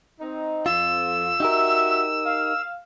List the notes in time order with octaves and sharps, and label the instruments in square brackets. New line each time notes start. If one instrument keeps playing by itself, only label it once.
[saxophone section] C4 D#4
[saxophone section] F2 [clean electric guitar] F4 [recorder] E6
[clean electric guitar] D#4 G4 A#4 [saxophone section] F#4 E5
[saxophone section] F5